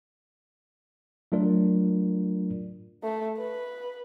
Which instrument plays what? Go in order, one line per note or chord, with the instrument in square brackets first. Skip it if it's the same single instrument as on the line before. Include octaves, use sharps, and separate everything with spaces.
[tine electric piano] F#3 A3 D4 F4 A#4 D5
[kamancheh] A3
B4